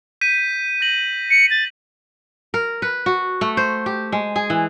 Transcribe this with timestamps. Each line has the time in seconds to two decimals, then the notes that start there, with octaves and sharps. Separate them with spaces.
0.21 G6 B6 D#7
0.81 G6 A#6 F#7
1.31 C#7 D#7
1.50 A6
2.54 A#4
2.82 B4
3.06 F#4
3.41 A3
3.57 C5
3.86 G4
4.12 G#3
4.36 G#4
4.50 E3